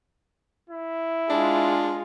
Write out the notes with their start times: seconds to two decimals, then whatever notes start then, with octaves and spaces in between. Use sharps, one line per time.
0.70 E4
1.30 G#3 D4 F4